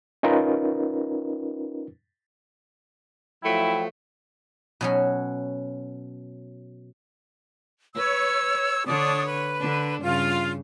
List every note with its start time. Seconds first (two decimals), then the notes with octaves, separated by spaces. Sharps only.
0.23 C#4 D#4 F4 A#4 B4
3.44 F3 F#3 A3 E4 G5
4.81 B2 F#3 C#4
7.95 B4 C#5 E6
8.86 D3 D4 C#5 D#6
9.25 B4
9.60 D3 D4
10.02 G2 C#3 F4